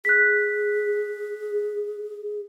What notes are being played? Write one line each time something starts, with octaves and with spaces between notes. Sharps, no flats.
G#4 F#6 B6